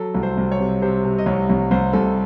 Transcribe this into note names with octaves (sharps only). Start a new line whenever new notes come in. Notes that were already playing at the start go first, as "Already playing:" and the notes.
Already playing: F#3 A4
C2
C5
C2
C#5
C3
C3 C5
C3
D#5
C2 C#5
C2
C2 C5
C2 A4